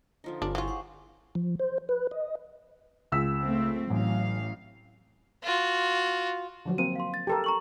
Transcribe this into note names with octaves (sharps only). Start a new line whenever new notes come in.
D3 F3 D#4
G1 C#4 D4 F4
F#3 E4 F4 G4 G#4 C5 F5 C#6
F5 F#5 C#6
F3
C5
B4
D#5
C#2 E6 B6
A3 C4
A1 F#3 F5
F4 F#4
D3 F3 F#3
A#3 C4 D#7
F5 C6
A6
G4 A4 A#4
A#5 C#6 F#7